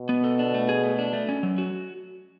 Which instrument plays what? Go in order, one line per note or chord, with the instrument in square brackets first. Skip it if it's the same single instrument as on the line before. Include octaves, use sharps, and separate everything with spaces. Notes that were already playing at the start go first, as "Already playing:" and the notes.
Already playing: [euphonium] B2
[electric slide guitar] B3
A4
D4
A3
G#4
A3
D4
A3
C#4
F#3
F#4